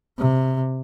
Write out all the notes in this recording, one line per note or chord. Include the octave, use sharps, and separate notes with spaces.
C3